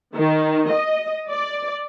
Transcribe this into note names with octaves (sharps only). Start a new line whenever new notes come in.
D#3
D#5
D5